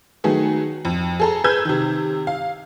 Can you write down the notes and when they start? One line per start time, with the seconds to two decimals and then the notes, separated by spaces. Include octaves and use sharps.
0.24 D#3 F#3 A3 B3 G#4
0.85 F2
1.20 G#4 A4 A#5
1.44 G#4 B4 E6 G6 G#6
1.65 C3 D#3
2.27 F5